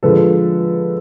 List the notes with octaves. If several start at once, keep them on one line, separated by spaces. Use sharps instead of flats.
D3 F3 G#3 A4 B4